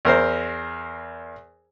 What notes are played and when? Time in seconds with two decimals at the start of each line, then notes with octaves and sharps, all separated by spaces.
0.05 E2 A#4 C5